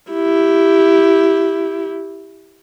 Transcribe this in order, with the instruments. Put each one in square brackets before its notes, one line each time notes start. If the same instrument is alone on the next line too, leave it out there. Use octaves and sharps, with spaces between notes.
[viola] E4 G4